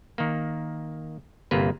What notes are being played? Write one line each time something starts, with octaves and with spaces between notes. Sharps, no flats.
D#3 A#3
G1 C3 A#3 B4